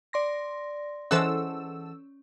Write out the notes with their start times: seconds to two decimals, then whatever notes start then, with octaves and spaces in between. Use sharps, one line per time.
0.13 D5 C6 A#6
1.11 E3 G#3 C#4 A4 C5 F#5 E6